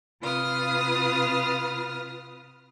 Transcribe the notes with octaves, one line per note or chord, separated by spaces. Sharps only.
C3 F4 B4 D#6 F6